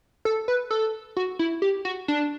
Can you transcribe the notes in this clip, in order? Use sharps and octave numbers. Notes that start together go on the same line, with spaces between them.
A4
B4
A4
F#4
E4
G4
F#4
D4